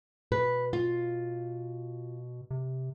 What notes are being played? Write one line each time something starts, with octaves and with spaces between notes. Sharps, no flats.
B2 B4
F4
C3